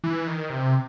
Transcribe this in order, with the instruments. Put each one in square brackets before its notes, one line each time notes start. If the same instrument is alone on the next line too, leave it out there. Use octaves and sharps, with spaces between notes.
[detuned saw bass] E3
D#3
C3